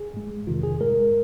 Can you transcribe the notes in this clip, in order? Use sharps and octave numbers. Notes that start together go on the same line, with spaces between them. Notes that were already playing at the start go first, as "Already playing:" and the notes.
Already playing: G#4
G#2 G#3
F2 C3 D#3 F4
G#4
G#2 G#3 A#4